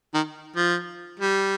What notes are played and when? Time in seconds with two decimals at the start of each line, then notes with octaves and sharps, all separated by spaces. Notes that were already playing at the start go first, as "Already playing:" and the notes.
0.14 D#3
0.56 F3
1.19 G3